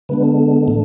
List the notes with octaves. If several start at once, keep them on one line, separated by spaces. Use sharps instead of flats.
D3 G#3 B3 D4 B4
A4
A2 E3 A3 D4